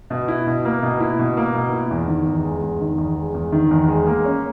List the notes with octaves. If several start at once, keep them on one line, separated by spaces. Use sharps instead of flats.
B2
E4
B2
A#3
B2
E4
B2
A#3
B2
E4
E2
D#3
E2
G#3
E2
D#3
E2
G#3
E2
D#3
E2
G#3
A#3
C#4